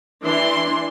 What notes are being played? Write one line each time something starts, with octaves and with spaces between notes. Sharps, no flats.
E3 D4 C6